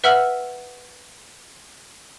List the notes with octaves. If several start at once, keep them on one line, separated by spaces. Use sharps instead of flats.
B4 E5 F#5 E6 F6 F#7